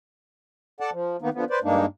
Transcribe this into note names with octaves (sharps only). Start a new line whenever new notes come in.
A4 D5 F#5 A5
F3
D#3 A#3 B3 D#4
D3 F3 B3
B4 C5 D5
G2 G#3 A#3 D4 D#4